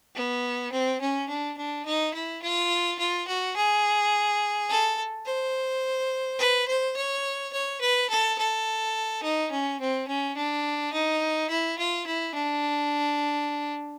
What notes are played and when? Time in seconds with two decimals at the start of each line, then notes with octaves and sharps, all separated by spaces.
0.15 B3
0.72 C4
1.01 C#4
1.29 D4
1.57 D4
1.86 D#4
2.14 E4
2.42 F4
2.99 F4
3.28 F#4
3.56 G#4
4.69 A4
5.26 C5
6.39 B4
6.68 C5
6.96 C#5
7.53 C#5
7.81 B4
8.10 A4
8.38 A4
9.23 D#4
9.51 C#4
9.80 C4
10.08 C#4
10.36 D4
10.93 D#4
11.50 E4
11.78 F4
12.06 E4
12.34 D4